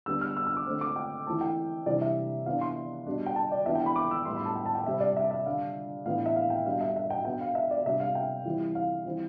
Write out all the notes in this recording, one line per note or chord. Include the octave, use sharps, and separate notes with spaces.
D3 G3 B3 D4 E6
F6
E6
E6
D6
D3 A3 C4
D6
G5
E3 A3 C4 A5
G5
C3 E3 G3 D4 D5
E5
E3 B3 D4 F5
C6
B2 G3 D4
G5
A5
D5
E3 B3 D4 E5
G5
B5
D6
E6
A2 G3 B3 C6
B5
A5
G5
A5
G5
C3 G3 C4 E5
D5
E5
E5
D3 G3 D4 F5
A2 E3 B3 D4 F5
E5
F5
G5
B2 G3 D4 F5
E5
E5
G5
B2 B3 D4 G5
F5
E5
D5
C3 G3 D4 E5
F5
G5
E3 G3 C4
F5
E3 G3 C4